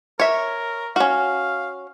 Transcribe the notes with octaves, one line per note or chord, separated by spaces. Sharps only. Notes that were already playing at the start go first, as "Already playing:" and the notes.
A#4 C#5 E5
C#4 F#4 F5